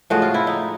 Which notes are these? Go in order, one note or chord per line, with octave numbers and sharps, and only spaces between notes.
A2 F3 G#3 F#4
F4
E4
D#4